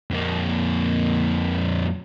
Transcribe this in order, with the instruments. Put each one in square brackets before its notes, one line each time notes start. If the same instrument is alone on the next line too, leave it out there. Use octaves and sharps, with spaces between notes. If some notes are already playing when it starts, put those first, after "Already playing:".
[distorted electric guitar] F2 A#3